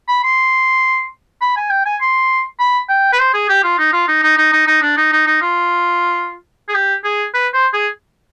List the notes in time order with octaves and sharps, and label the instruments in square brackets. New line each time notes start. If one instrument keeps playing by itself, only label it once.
[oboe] B5
C6
B5
G#5
G5
G#5
C6
B5
G5
B4
C5
G#4
G4
F4
D#4
F4
D#4
D#4
D#4
D#4
D#4
D4
D#4
D#4
D#4
F4
G#4
G4
G#4
B4
C5
G#4